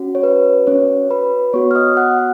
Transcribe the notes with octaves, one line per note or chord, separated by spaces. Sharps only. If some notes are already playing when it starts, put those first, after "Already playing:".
Already playing: C#4 F#4
C#5
B4
C#4 C#5
B4 B5
B3 F#4 C#5 C#6
F6
D#5 D#6
F#5 F#6
F#5